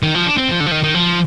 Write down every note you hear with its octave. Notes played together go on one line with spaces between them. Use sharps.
D#3
F3
D4
C4
F3
D3
F3
D#3
D#3
F3